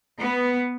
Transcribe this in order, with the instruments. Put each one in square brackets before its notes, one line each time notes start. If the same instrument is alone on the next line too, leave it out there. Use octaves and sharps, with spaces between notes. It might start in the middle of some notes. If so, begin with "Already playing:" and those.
[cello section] B3